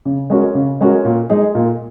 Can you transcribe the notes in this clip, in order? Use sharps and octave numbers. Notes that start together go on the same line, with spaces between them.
C#3
G#3 C#4 F#4 A#4
C#3
G#3 C#4 F#4 A#4
A#2
G#3 D#4 G#4
A#2